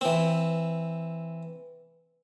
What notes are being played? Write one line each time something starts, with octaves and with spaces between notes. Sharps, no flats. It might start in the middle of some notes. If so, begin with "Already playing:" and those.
E3 C4